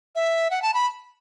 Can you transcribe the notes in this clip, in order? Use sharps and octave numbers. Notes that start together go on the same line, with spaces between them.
E5
F#5
A5
B5